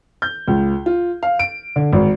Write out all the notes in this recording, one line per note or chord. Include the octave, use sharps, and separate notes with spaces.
G6
C#2
F4
F5
D7
D3
G#1